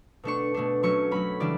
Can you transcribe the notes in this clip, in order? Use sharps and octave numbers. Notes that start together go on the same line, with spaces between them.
B2 A3 D4 C#6
B2 A3 D4
F#3 A3 C#4 C#6
F#3 A3 C#4 B5
C#3 E3 G3 D4 D5